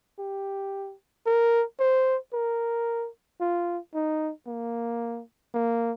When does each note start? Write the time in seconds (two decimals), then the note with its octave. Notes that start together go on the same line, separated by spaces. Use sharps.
0.19 G4
1.26 A#4
1.80 C5
2.33 A#4
3.41 F4
3.94 D#4
4.47 A#3
5.54 A#3